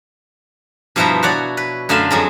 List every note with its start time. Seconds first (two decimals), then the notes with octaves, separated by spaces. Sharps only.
0.96 G2 B2 F3 E4 C5 A#5
1.23 F#4 C#5 D5 F#5
1.57 B4
1.89 F#2 D3 A3 E5 F5 C6
2.11 F2 F#3 G#3